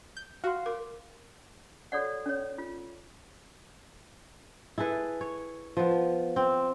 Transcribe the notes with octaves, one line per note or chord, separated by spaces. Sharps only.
G6
F#4 F5 F#5 C6
A#4 D6
F#4 A4 C#5 D5 F#5
C#4 C#5
F4
E4 G#4 A4 B4
C#5
F3 B3
C4